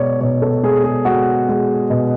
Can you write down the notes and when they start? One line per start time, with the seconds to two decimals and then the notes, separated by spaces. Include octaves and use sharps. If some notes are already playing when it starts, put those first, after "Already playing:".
Already playing: B2 G#3 C#5 D5
0.21 B2 C#5
0.42 A4
0.63 G#3 G#4
0.84 G#4
1.05 G#3 F#4
1.48 G#3
1.90 B2